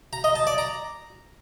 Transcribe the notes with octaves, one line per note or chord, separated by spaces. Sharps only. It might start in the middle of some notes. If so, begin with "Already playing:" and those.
A#5
D#5
A5
D5
A#5